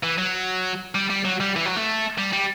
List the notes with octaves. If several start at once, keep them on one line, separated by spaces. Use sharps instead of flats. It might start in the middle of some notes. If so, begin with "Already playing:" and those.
E3
F#3
G3
G3
F#3
G3
E3
F#3
A3
G3
G3